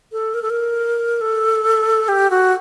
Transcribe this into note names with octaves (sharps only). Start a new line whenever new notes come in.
A4
A#4
A4
A#4
A4
G4
F#4